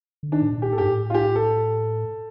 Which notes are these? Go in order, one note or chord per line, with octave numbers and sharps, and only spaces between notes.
D3
D#3 D4
A2
A#2
G4
A2 A4
G2 G4
A2
F4
G4
A4